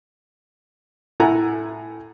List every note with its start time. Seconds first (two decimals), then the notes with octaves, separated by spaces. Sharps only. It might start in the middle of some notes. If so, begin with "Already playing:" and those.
1.20 A2 E4 A4 F#5 G#5 A#5